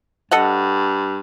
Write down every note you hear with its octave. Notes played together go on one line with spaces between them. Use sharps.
G2 A4 D#5 F#5